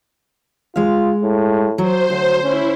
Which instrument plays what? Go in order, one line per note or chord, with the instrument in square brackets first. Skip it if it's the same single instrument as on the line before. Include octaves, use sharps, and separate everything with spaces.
[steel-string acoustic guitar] G#3 F5 [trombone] F4
[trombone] A2
[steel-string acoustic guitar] F#3 [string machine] C5
[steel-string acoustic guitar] D2 [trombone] F#3
[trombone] C#4 [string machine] E4